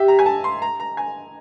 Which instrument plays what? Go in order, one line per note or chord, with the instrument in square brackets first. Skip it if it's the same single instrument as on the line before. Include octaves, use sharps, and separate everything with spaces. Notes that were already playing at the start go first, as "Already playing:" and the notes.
Already playing: [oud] G4 [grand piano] E5
[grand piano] A#5
G#5
A5
C6
A#5
A#5
G#5